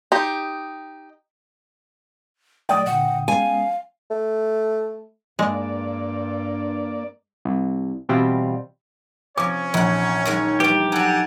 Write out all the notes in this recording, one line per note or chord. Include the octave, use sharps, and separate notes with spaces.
D#4 G4
F#3 A3 D5 D#5 G5 D#6
A#2 D3 F#5
G#3 B3 C#4 F5 G#5
A3
G2 G#3 A#3 D5
C2
B2 E3 G3 C4 F4
C3 F3 C#4 C#5 D6
A#1 E2 F#5
F#2 D#3 G#3
E3 G3 G4
F#3 D#4 A4 F#5 G#5